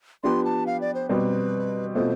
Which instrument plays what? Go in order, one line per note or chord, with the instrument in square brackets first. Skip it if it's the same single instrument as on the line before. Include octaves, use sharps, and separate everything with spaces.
[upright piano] F3 B3 D4 G4 [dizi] C6
[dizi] A5
F5
D5
C5
[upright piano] B2 G3 C4 [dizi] B4
[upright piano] B2 A3 C4 F4 [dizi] C5